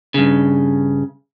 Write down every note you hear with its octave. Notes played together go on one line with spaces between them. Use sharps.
G2 C#3